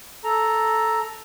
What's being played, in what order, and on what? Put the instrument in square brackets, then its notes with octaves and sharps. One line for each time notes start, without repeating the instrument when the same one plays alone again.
[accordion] A4 A#5